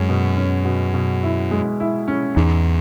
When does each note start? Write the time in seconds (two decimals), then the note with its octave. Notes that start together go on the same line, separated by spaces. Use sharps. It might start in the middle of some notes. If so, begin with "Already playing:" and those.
Already playing: F#2 G#3 C#4
0.09 B2
0.37 C#4
0.65 B2
0.94 B2
1.23 E4
1.51 G#3
1.80 E4
2.08 C#4
2.36 E2 G#2